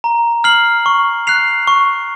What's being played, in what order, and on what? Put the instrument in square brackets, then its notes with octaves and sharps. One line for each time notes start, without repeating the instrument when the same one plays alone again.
[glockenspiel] A#5
F6 C7 F#7
C#6
F#6 C7 F7
C#6